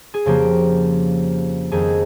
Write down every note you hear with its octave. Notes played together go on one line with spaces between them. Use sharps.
G#4
F2 C#3 F3 A#3 G4
F2 D#3 G#3 G#4